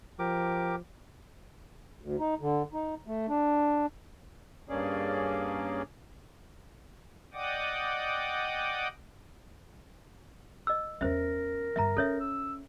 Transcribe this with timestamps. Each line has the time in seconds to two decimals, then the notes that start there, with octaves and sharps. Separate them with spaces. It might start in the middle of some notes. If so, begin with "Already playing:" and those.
0.19 F3 G4 A#4 D6
2.01 D2
2.19 D#4
2.41 D3
2.73 D#4
3.07 A3
3.28 D4
4.69 G2 A#3 C#4 G#4 D5
7.33 D5 D#5 F#5 G5 D6 D#6
10.67 D#5 E6
11.01 E2 C#4 A#4 C5 E5
11.76 G1 G2 E5 A#5
11.97 C#4 A4 C#5 E5
12.20 E6